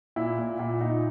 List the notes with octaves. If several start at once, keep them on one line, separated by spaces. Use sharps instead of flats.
A#2 E4
A#2
A#2
A#2 D#4